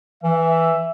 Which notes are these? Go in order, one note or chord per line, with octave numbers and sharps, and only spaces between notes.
E3 E5